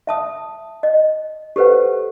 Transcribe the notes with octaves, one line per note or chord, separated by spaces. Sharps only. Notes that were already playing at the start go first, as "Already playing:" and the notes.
E5 A5 D#6
D#5
G4 A4 B4 C5 F#5